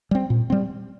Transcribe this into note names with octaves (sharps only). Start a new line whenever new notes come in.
G3 C4
A#2
G3 C4